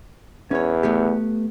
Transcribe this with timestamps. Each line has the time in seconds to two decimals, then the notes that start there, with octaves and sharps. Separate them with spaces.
0.51 E2 C#4 C#5
0.83 A3 B3 G4